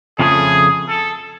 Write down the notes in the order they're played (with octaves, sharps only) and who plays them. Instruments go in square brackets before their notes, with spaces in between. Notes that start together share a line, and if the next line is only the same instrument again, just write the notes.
[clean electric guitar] F2 C#3 F3 A3 [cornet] G#4
[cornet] A4